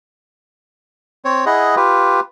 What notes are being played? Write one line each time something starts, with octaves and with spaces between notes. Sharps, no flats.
C4 C#5
E4 G#4 D#5 F#5
F4 G4 B4